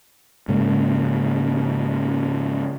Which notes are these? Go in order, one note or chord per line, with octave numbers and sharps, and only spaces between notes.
G#2 C#3 G#3 A#3